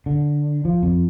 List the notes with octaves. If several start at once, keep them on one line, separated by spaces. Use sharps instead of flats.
D3
F3
F2